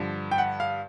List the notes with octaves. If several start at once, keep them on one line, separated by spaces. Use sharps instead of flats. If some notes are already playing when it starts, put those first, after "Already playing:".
Already playing: G2 D3 F3
G5
F#5
F5